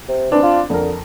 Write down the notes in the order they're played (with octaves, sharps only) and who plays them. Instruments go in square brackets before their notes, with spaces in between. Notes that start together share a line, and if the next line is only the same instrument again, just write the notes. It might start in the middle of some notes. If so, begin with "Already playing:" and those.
[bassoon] C3
[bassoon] E3 [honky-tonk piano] C4 D4
[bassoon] F4
[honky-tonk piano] F2 A#4 [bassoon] D3